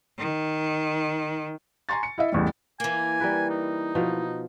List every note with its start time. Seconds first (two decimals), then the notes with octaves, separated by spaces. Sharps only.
0.18 D#3
1.89 G#5 A#5 C6 C#6 A6
2.03 C#7
2.18 E4 D#5 E5
2.32 A1 E2 G3
2.80 E3 A#3 G#5
3.20 G3 A#4 B4
3.50 D#4
3.95 B2 F3